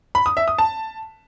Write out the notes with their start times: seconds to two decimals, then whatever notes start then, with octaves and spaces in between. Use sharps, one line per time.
0.15 B5
0.26 D#6
0.37 E5
0.48 D#6
0.59 A5